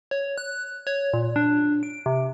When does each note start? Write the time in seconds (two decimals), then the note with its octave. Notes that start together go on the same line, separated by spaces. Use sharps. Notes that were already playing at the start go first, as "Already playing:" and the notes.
0.11 C#5
0.38 F#6
0.87 C#5
1.13 A#2
1.36 D4
1.83 D7
2.06 C3